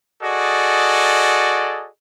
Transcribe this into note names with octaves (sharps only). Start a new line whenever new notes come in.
F#4 G#4 A4 D5 D#5